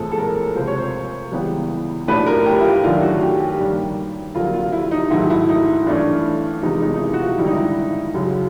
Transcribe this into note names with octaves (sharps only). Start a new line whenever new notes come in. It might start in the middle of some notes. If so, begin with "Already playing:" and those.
Already playing: A#1 A2 E3 G#3 C4 A4
A4
A#4
C#2 C3 F3 C5
C#5
C5
C#2 C#3 E3 G3 B3
B1 A2 F3 A3 D4 B4
A#4
G4
E4
F4
F#2 D#3 F#3 A3 D4 F4
F#4
G4
G4
G2 D#3 G3 A#3 D4
F2 D3 F#3 A#3 F4
F4
E4
D#4
G#2 D#3 F#3 A3 E4
E4
D#4
G2 E3 A3 C#4 D4
F1 E2 C3 F3 G#3 D#4
D#4
D#4
E4
F#4
F4
G#1 G2 D3 G3 E4
D#4
E4
F#2 C#3 F#3